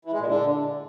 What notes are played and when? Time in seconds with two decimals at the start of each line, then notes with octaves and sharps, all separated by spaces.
0.05 E3
0.12 G#3
0.20 A#2
0.27 D3